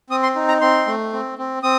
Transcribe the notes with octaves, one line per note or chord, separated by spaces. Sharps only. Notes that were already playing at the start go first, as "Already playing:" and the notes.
C4 D#6
C6
D#4
A#5
C4 C6
A3
C4
C4
C4 D#6